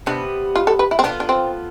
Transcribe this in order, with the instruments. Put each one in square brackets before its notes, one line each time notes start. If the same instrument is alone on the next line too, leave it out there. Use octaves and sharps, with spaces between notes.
[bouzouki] C3 G3 B3 [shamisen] D4
[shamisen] F4
A4
B4
E4
C4
[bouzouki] B3 F4 A4 [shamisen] D4
[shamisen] D4
C4